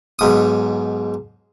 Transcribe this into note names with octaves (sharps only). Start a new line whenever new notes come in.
B1 G#2 D#6